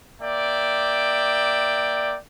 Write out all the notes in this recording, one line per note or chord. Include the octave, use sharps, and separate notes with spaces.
A#3 D5 E5 G5